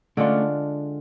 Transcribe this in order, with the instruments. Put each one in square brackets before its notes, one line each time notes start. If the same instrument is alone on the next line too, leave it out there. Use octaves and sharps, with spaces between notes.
[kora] D3 G#3 D4 F4 [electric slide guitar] A3 C#4